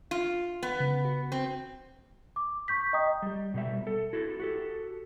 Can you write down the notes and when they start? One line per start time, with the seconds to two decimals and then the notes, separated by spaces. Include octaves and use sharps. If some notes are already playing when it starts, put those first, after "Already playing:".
0.11 F4
0.63 B3
0.80 C#3
1.05 F#4
1.32 C4
2.36 D6
2.68 C#6 G6 B6
2.93 D#5 G5 A#5 D#6
3.22 G3 G4
3.54 B2 G3 E5
3.87 A4
4.13 E4 F#4 A4
4.40 F#4 G4 A4